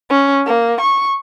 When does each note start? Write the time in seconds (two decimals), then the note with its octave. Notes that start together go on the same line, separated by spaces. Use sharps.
0.10 C#4
0.46 A#3
0.81 C#6